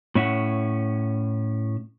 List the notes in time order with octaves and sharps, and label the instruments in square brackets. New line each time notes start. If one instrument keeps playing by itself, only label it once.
[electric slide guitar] A2 C#4 E5 F#5